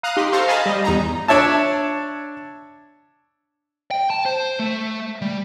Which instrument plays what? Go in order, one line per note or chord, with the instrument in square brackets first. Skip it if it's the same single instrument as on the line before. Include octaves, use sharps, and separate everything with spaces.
[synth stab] F5 A#5 D#6 F#6
D#4 G4 C6
A4 C5 F5 A#5 C6 C#6
D#5 F5 G#5 A5 B5
G3 D#5
E2 D#4 A#5
[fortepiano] D4 C#5 E5 A5
[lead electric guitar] G5
A5
C5
A3
G3